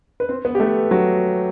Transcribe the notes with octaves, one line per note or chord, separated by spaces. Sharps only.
B4
C4 C5
B3 B4
G4
A3 A4
F#3 F#4